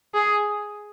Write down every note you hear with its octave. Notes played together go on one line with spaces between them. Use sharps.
G#4